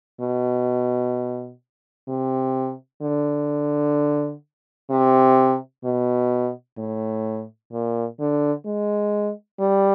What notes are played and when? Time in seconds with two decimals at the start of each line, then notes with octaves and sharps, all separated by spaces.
0.21 B2
2.08 C3
3.02 D3
4.90 C3
5.84 B2
6.78 A2
7.72 A#2
8.19 D3
8.66 G#3
9.60 G3